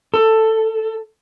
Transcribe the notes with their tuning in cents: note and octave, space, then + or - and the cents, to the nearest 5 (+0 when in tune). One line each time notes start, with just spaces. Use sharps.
A4 +10